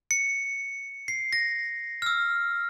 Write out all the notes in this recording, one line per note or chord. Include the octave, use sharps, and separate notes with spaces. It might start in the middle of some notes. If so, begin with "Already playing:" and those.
C#7
C7
A#6
F6
E6